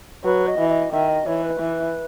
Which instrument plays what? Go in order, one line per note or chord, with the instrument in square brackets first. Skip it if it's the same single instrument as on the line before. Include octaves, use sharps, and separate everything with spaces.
[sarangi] F#3 [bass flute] B4
[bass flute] D#5
[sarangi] E3
[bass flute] D#5
[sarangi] D#3 [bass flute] E5
[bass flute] D#5
[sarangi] E3 [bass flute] C#5
[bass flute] B4
[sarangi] E3